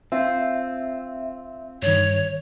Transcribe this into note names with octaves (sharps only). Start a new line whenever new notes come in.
C4 F4 E5
G2 D#3 C#5